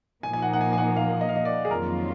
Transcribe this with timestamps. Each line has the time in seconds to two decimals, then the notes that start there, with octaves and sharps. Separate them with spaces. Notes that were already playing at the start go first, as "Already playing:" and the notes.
0.23 A#2 F3 A#3 D#4 G#5
0.33 G#5
0.42 F#5
0.53 F#5
0.61 G#5
0.73 G#5
0.78 F#5
0.97 F5
1.21 D#5
1.29 F5
1.36 D#5
1.45 D5
1.65 G#4
1.70 F2 D#3 F#3 A#3 F4 A#4